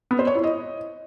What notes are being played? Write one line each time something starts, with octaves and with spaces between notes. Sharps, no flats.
B3
C5
C#5
E4
D#5